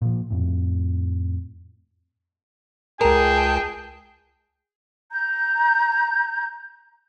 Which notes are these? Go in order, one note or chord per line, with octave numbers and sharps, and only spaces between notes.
A#2 F3
F2 A2
C#2 G#4 A#4 G5 A5
A#5 G6